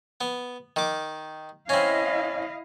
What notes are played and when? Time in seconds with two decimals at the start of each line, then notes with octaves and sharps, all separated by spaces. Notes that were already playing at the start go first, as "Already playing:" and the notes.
0.21 B3
0.76 D#3 D6
1.69 C4 C#4 E4 D#5 F5